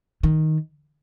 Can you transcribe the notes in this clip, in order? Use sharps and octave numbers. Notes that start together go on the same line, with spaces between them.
D#3